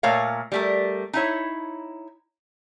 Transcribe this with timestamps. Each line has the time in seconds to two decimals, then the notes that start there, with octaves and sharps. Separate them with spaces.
0.03 A#2 A3 A#4 C#5 F5
0.52 G3 A3 A#4
1.13 D#4 E4 C#5